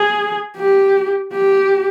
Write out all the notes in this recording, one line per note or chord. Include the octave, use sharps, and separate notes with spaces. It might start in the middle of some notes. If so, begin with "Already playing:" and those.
Already playing: G#4
G4
G4